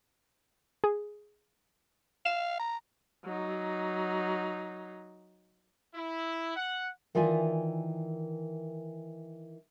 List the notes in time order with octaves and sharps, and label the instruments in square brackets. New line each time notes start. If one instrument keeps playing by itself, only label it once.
[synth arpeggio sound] G#4
[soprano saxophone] F5 [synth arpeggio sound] E7
[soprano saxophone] A#5
[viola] F#3 D#4
[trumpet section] E4
F#5
[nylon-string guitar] D#3 E3 F4 D5 E5 G#5